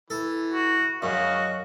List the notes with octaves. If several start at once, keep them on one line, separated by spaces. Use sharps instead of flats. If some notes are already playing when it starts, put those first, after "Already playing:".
E3 A4
F#4
F#2 F#4 D#5 F5 C#6